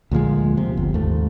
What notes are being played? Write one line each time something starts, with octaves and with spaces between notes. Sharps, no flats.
D2 A#2 F3 G#3
C3
G1
D#2 G#2 A3